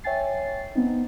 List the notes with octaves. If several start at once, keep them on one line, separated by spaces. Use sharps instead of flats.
C#5 E5 G5 G#5 A6 C7
B3 C4 D#4